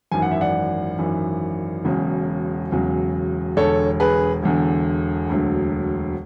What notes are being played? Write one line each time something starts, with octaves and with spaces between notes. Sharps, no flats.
G#1 F#2 E3 G#5
F#5
E5
D5 F#5
G#1 F#2 E3
E1 E2 C#3 F#3
E1 E2 C#3 F#3
E1 E2 D3 A4 C#5
G#4 B4
E1 E2 D3
E1 D2 D3 F#3